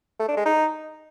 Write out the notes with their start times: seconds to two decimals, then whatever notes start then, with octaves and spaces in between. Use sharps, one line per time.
0.20 A3
0.28 D4
0.37 G#3
0.46 D#4